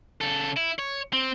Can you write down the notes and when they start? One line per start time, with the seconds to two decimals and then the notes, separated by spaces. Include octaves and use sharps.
0.21 C#3 A4
0.57 E4
0.79 C#5
1.13 C4